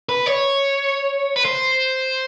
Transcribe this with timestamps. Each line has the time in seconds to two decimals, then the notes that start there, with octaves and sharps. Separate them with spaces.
0.09 B4
0.26 C#5
1.36 B4
1.45 C5